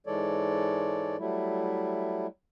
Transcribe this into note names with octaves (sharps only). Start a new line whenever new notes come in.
G#2 E3 G#3 A4 C#5 D5
F#3 G3 A3 E4